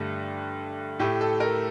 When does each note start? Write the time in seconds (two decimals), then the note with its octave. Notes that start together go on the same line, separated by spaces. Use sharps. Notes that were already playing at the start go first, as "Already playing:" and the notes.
Already playing: G2 D3 A3 G4
0.99 A2 A3 G4
1.21 A4
1.40 A#4